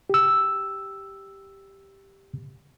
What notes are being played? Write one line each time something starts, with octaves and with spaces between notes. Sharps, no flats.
G4 E6